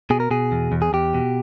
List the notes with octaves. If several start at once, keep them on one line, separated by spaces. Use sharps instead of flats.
B2 G#4
A#4
B2 G#4
E2
E2
G#4
E2 G4
B2